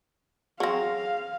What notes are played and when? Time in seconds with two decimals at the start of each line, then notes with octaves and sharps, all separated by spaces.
0.60 F#3 C4 G#4 F5 A#6